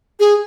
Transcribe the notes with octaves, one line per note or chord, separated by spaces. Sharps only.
G#4